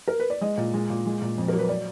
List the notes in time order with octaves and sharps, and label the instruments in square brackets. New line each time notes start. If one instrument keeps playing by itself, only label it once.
[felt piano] A#4
B4
D5
G#3 D#5
A#2
G#3
A#2
G#3
A#2
F2
F#3 A#4
B4
D5